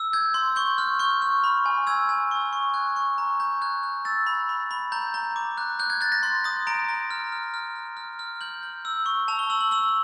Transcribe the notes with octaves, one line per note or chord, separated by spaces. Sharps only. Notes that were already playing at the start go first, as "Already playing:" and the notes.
Already playing: E6
G6 G#6
C6 G6
C#6 G6
F6
C#6 G6
F6
B5
G#5
E6 G#6
G#5
C#6
C#6
F#6 G#6
C#6
A#5
A#5 G6
F#6 G#6
F#6
E6 A6
B5
B5
B5
A#5 G6
A#5
D6
F#6
F#6 G6
G#6
F#6 A6
A#6
C6 A6
D#6 A#6
A#5 D7
A#5
F6
F6
F6
F6
F6
F6
G6 F#7
G6
E6
C#6
A5 F7
G7
E6 F#7
F#7
E6 F#7